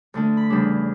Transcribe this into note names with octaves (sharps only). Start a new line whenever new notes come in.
D2 D3 A3
B5
E2 C#3 G3 D4